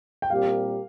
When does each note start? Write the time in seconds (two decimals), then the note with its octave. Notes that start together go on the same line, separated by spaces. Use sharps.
0.22 G5
0.30 A#2 G3 C4 G4 A#4 F5